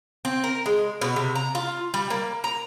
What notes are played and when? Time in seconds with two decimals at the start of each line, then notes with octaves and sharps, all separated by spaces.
0.25 C4
0.44 A#4
0.66 G#3
1.01 B2
1.16 C3
1.35 A#5
1.55 F4
1.94 G3
2.10 A#3
2.44 A#5